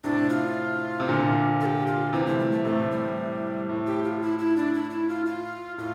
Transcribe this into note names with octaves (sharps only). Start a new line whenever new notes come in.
A2 C3 D4
F4
C3
A#2 D3
A4
G4
F4
C3 E3 E4
A3
G3
A3
A2 C3 A3
G3
A2
G4
F4
E4
E4
D4
E4
E4
F4
F4
A2 F4